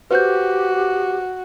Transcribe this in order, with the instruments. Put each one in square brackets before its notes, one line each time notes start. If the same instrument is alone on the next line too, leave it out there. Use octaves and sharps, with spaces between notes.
[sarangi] F#4 [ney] G4 [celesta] B4 C5 G6